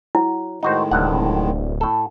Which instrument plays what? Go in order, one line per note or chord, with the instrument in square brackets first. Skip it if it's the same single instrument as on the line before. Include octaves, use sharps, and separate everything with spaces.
[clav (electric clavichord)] F#3 [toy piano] E4
[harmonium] A2 D#3 G#3 [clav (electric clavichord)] D#4 F#4 C5
[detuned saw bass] D1 [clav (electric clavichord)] C2 G2 F#5
[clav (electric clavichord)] A2 A4